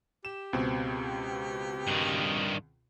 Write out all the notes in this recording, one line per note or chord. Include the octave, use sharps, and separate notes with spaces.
G4 E7
C#2 B2 C4
G2 D#3